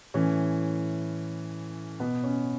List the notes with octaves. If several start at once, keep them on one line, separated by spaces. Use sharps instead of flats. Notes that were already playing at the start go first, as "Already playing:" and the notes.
A2 E3 C#4
B2 B3
C#4